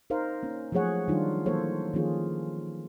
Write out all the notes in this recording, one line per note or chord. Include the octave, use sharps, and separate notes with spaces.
D#4 A#4 C5 F5
A#3 C#4
F3 F#3 A3 G#4 C#5 F#5
D#3 F#3 G3 D4 D#4 F4
E3 F#3 A#3 A4 C5 C#5
D#3 F3 A#3 C#4 F4 G#4